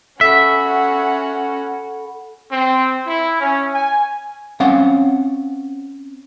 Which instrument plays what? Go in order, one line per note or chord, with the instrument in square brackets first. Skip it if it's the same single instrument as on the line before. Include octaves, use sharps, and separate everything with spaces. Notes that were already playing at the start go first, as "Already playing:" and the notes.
[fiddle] C#4 F#4 [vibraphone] A4 F#5 B5 [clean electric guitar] E5
[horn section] C4
E4
C#4
G#5
[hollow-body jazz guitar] C4 C#4 F5 F#5